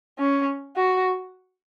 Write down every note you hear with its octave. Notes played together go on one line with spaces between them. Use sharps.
C#4
F#4